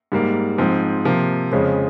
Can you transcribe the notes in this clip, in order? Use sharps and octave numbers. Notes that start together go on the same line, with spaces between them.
G#2 G3 A#3
G#2 F3 C4
C3 F3 A#3
F2 C#3 F3 G#3 C#4